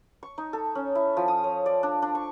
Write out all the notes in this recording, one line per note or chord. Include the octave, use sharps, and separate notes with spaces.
C#6
D#4
A4
C#4
E4
F3
D#6
C#5
D5
D4
D4
C#6